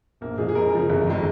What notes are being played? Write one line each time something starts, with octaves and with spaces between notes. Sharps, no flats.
A#1 A#3
G#2 F3 G#3 G#4
G#4
F2 A#4
C#3 F3 G#3
G1
F2 D#3 G#3